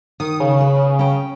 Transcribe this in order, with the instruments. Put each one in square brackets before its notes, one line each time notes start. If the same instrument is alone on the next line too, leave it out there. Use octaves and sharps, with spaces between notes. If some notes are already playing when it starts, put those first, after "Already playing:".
[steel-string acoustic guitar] D#3 [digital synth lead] D#6
[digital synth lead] C#3
[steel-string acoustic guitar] B4
C#4 G5